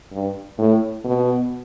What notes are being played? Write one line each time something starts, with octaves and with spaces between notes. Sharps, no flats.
G2
A2
B2